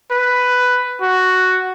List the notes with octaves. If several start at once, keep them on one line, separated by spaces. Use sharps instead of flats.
B4
F#4